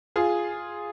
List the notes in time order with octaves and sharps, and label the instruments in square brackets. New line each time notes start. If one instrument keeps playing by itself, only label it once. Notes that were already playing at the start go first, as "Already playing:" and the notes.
[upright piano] F4 G#4